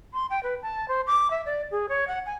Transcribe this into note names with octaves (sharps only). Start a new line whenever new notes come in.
C6
G5
B4
A5
C5
D6
E5
D5
G#4
C#5
F#5
G#5